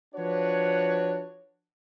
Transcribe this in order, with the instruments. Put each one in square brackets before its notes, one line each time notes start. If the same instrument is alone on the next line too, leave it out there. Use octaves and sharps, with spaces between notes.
[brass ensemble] F3 D4 F#4 B4 C#5